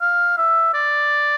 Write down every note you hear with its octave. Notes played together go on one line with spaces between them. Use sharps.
F5
E5
D5